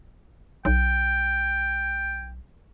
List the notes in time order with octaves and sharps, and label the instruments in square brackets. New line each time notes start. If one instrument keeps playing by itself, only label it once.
[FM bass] B1 [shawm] G5